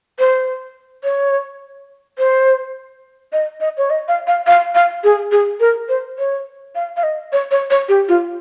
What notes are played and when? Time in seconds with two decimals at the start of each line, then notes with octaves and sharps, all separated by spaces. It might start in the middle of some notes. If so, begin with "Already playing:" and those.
0.19 C5
1.04 C#5
2.18 C5
3.32 D#5
3.60 D#5
3.77 C#5
3.90 D#5
4.08 F5
4.27 F5
4.47 F5
4.75 F5
5.04 G#4
5.32 G#4
5.60 A#4
5.89 C5
6.18 C#5
6.75 F5
6.97 F5
7.03 D#5
7.32 C#5
7.51 C#5
7.70 C#5
7.89 G4
8.08 F4